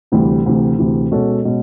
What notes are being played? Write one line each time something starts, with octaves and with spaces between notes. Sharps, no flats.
D2 C3 E3 G3
D2 C3 E3
D2 C3 E3
B2 G#3 C#4 F#4 A4
B2 G#3 C#4